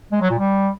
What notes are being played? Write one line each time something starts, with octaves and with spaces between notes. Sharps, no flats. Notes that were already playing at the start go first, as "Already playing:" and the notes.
G#3
F#3
A#2
G3